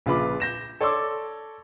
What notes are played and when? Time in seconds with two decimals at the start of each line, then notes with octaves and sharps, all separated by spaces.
0.06 A#1 C#3 F4 B4 B5 D6
0.40 G6 A#6 E7
0.81 A4 C#5 D5 C6 D6 E6